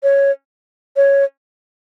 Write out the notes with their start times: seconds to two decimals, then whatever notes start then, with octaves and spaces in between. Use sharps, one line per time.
0.03 C#5
0.96 C#5